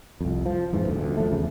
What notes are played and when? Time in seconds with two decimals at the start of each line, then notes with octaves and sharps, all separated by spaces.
0.21 C2 F2
0.46 F3
0.73 F2 G#2 E3
0.86 D#1 D2
1.18 F3 A3
1.32 E2 C#3